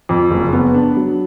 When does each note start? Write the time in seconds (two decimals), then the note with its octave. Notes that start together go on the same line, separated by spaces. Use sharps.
0.09 F2
0.31 F#1
0.53 B3
0.74 D4
0.97 F#3